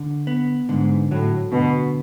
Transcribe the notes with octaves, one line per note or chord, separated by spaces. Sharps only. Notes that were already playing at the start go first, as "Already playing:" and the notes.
Already playing: D3
B3
G#2 D3
A2 F#3
B2 D3